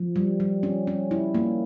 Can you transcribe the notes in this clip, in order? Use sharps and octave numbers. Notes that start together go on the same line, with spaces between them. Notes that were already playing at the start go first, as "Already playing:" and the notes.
Already playing: F3
G3
G3
C#4
C#4
E4
A#3